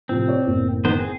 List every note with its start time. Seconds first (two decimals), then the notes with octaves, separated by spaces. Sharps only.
0.09 A2 C3 F3 C4
0.28 C#5 D5
0.47 F#1 E2 A2
0.85 D#3 B3 C5
0.99 C4 G#4